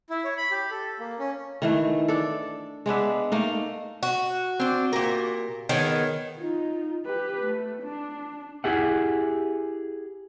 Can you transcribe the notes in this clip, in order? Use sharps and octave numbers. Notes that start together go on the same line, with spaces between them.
E4
C#5
B5
G4
A4
A#3
C#4
D#3 E3 A3
D4 A4
G#3 B3 D4 E5
A3 A#3 D#4
F#4
C4 D4
A#2 G4 A#4
D#3 B3 G#4 C#5
D#4 F4
G4 B4
A3
D4
E4 G4 G#4 E5 F#5